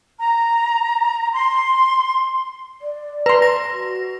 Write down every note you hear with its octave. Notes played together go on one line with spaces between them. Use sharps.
A#5
C6
D5
B4 A#5 C6
A#6
F#4